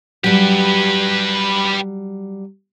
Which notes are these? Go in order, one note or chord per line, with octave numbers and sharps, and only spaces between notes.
F#3 G3 G4 B4